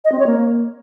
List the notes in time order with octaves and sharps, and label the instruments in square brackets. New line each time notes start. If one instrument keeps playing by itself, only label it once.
[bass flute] D#5
C4
C#5
A#3